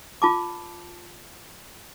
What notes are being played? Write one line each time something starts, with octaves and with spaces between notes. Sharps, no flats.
F4 A5 D6